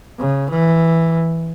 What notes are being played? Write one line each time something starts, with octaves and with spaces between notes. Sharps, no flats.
C#3
E3